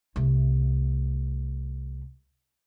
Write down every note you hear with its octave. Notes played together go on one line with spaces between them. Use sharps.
C2 A3